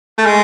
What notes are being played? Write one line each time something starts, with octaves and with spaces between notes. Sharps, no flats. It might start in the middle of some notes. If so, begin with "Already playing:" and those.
A3
G#3